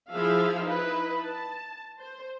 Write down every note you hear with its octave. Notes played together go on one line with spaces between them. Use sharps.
F3 E4 G#4 E5 F5
D#4 E4 B4
A5
C5